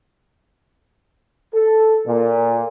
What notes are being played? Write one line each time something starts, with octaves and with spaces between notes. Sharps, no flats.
A4
A#2